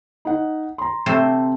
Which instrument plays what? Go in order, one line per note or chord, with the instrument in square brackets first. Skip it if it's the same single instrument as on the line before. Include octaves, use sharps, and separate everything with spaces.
[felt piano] D#4 F#5
A#5 C6
[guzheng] C3 A3 C5